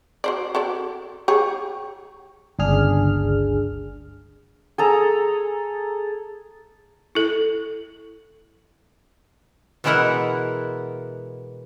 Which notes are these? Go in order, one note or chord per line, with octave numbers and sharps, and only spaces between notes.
F#4 C5 D5
F#4 A4 D5
G4 G#4 C#5
G1 C#2 D4 G#4 F6
G#4 A4 A#5
E4 A4
B2 E3 G#3 E4 A#4 F#5